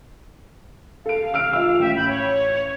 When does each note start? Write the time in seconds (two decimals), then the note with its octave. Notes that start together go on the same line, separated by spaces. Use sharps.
1.06 A4 F5 D7
1.34 E6 F6 D7
1.53 F4 E6
1.79 A1 E5 G5
1.96 B5 G6
2.08 C#5